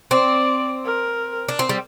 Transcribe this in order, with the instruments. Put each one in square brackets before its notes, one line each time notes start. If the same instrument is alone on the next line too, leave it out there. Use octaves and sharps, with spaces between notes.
[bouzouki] C4 [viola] D5
[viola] A#4
[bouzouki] D4
C4
G3